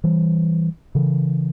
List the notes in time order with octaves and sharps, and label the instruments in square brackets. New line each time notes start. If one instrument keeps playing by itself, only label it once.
[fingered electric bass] E3 G3
C#3 E3